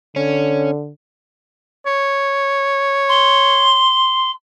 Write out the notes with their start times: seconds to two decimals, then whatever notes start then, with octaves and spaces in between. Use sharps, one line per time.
0.16 D3 C#4
1.86 C#5
3.09 C6